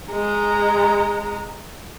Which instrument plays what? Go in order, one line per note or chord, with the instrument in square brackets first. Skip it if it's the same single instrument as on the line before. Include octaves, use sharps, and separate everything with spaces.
[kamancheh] G#3 A#5